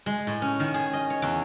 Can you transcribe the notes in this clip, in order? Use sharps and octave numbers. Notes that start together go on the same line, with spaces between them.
G#3
A2
C#4
D#3
G#4
D#5
C#5
E2